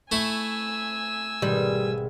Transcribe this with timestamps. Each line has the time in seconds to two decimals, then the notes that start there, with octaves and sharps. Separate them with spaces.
0.12 A3 E4 G#5 C#6 E6
1.42 G#1 B2 G3